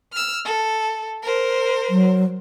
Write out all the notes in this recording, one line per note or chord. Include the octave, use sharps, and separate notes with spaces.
E6 F6
A4
A#4 C5
F#3